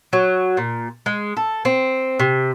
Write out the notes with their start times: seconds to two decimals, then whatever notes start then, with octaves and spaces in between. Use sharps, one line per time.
0.13 F#3
0.57 A#2
1.06 G#3
1.37 A4
1.65 C4
2.19 C3